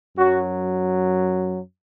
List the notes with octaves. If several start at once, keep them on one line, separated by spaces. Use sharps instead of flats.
F#2 F#3 F#4